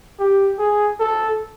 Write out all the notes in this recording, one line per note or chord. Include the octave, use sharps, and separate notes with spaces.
G4
G#4
A4